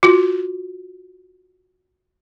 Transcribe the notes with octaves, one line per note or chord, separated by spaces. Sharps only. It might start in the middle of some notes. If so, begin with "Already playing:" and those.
F4 F#4